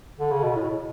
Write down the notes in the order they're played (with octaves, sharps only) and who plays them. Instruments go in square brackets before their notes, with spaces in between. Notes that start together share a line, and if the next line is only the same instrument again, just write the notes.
[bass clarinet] D3
C#3
B2
A2